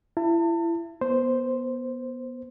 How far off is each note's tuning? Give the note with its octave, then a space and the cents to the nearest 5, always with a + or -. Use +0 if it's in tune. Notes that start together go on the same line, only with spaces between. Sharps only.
E4 +30 A5 +35
B3 -20 C5 +0